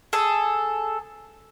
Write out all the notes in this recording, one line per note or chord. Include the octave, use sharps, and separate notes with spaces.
G#4 A4